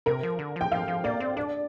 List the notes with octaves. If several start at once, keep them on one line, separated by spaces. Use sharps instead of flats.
C3 A#4
F3
D3
F3 G5
F3 F5
F3
A#3 D5
C4
D4 D5